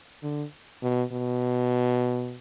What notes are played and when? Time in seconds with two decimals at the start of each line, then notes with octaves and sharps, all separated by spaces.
0.23 D3
0.82 B2
1.12 B2